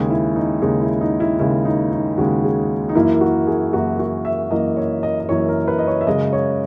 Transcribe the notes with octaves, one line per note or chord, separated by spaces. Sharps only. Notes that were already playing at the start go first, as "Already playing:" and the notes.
Already playing: D#2 C#3 G#3 G#4
E4
D#4
D#2 C#3 G#3 D#4
E4
D#4
E4
D#2 C#3 G#3 E4
D#4
D#4
D#2 C#3 G#3 F#4
G#4
D#4
F#2 E3 A#3 E4
F#4
G#4
F#2 E3 A#3 F#4
F#4
E5
F#2 E3 A#3 D#5
C#5
D#5
D#5
F#2 E3 A#3 C#5
A#4
B4
D#5
C#5
E5
F#2 C#3 G#3 D#5
C#5